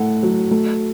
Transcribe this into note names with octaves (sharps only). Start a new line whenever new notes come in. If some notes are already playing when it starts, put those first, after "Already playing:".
Already playing: A2 A3 F#5
F#3
A3